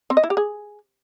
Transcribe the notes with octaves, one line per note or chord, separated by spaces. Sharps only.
C4
D#5
E4
G4
G#4